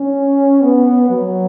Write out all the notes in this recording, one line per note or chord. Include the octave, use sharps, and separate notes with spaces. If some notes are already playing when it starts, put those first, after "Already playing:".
Already playing: C#4
B3
F#3